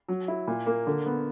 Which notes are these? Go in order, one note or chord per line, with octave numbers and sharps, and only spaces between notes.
F#3
E4
A#2
A#3
D3
B3